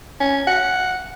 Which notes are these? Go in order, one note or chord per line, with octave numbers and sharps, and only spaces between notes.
C#4
F#5